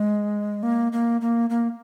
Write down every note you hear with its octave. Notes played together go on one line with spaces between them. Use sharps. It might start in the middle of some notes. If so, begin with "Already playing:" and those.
Already playing: G#3
A#3
A#3
A#3
A#3